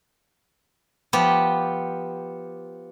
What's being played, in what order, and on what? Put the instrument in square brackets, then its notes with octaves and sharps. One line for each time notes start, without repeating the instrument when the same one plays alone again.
[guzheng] F3 B3 G4